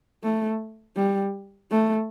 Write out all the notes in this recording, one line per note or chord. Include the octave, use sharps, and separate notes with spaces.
A3
G3
A3